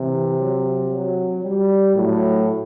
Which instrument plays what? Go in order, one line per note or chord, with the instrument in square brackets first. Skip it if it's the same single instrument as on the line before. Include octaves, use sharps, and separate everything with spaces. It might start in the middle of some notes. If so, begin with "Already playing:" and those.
Already playing: [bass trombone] C3 [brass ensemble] E3
[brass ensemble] F#3
F#3
G3
[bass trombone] A2 [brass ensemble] F#3